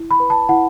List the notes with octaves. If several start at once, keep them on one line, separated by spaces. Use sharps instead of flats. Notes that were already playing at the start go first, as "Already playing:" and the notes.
Already playing: E4
B5
B4
A5
E4 F#5